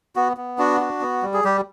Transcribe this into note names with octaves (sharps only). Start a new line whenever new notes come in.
B3 F#4
B3
D4 F#4
F#4
B3
G3
G#4
G3 G4